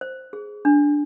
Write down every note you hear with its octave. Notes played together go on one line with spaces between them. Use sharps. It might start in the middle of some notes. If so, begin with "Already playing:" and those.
C5
G#4
D4